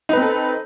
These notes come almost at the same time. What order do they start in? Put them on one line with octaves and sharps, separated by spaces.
D#4 B4 C4 A4